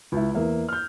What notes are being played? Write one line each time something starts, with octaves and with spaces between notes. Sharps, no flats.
C#2 E4
E2 A#3 E5
F6 G6